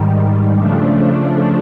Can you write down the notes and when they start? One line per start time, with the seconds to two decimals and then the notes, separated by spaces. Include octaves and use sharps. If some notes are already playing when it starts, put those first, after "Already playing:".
Already playing: G#2 D#3 G3
0.55 C#3 F3 A3 D4